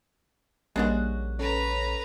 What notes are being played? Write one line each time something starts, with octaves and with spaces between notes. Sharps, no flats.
A#1 G3 G#3 A#3 C#4 D4 F#4
C#4 A4 B4 C#5 A#5